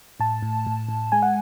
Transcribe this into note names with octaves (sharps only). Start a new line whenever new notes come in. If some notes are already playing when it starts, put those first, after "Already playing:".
A2 A5
A2
A2
A2
G#3 G#5
F#5